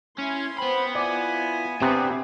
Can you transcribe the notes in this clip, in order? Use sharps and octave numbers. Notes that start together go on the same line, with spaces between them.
C#4 E4 C6
B3 C4 C5 G5 B5
E4 F4 D5 G#5
C3 B3 C4 D4 G4